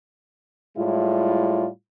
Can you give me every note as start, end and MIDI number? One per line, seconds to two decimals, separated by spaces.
0.77 1.67 45
0.77 1.67 55
0.77 1.67 56
0.77 1.67 64
0.77 1.67 65